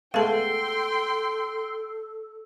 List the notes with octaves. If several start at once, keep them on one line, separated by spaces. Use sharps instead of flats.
G#3 A3 B3 A4 F5 G5 A5 C6